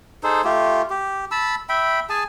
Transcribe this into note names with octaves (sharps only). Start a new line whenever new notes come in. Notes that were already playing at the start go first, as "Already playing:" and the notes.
D#4 G#4 A4 C5
A3 F4 G4
G4
A5 B5 E6
E5 G5 B5
G#4 G#5 A5